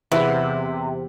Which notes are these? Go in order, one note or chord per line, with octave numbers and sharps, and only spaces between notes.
E2 C3 E4 B4